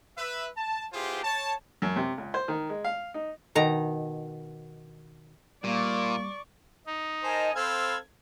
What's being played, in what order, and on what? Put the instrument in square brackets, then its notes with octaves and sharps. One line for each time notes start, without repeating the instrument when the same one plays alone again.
[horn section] B4 E5
A5
B3 E4 F4 G4 G#4 C5
C#5 A5
[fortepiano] F#2
C3
C#2
C5
D#3
G#3
F5
D#4
[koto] B2 D#3 A#5
[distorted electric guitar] A#2 [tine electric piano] G3 [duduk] A#3 [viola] D5 C#6
[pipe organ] D#4
[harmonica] A#4 C5 [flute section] D#5 G#5 A5
[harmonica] C4 A4 F5 [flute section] C5 B5 [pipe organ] G#6